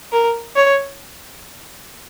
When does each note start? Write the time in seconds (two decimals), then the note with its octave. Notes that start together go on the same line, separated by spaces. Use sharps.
0.13 A#4
0.56 C#5